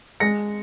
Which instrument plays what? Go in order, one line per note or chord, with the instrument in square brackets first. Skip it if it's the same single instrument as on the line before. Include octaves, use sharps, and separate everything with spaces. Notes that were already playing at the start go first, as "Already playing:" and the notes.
[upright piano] G#3 A#6 C#7